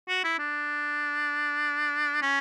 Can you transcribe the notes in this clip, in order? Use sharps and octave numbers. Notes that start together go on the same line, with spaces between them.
F#4
E4
D4
C#4